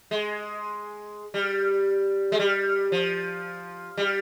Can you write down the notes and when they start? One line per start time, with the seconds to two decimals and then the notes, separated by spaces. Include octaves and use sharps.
0.11 G#3
1.34 G3
2.32 G#3
2.39 G3
2.92 F3
3.97 G3